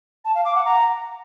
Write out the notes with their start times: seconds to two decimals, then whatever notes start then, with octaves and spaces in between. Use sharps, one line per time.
0.25 A5
0.35 F5
0.45 D6
0.55 F#5
0.65 A#5